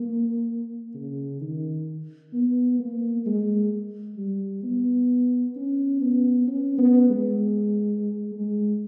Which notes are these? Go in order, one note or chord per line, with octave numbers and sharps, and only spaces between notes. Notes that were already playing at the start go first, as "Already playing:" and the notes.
Already playing: A#3
C#3
D#3
B3
A#3
G#3
G3
B3
C#4
B3
C#4
B3
G#3
G#3